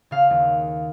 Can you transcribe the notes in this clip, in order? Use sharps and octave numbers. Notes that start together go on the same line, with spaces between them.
C#3 F5
D#2